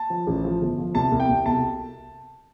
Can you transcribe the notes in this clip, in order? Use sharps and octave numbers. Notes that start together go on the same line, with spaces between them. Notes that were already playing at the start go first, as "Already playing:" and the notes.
Already playing: A5
F3
A1
F3
G1
F3
C2 A5
C2
G5
C2
B1 A5